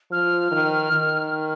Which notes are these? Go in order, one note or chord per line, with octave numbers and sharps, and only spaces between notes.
F3 F6
D#3
D#3